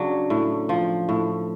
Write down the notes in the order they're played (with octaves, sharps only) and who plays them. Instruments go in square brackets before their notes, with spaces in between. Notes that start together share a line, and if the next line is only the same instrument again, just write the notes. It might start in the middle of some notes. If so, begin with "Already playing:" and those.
Already playing: [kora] C#3 F#3 D4
A2
F3
A2